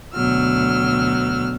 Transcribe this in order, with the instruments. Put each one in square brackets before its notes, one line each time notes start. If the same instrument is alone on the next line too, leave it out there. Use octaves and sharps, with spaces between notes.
[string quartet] D2 B2 F#3 E6 F6